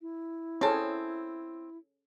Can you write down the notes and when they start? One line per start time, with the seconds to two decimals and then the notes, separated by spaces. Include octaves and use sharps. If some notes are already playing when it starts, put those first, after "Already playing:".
0.02 E4
0.61 C4 C#4 G#4 A4 A5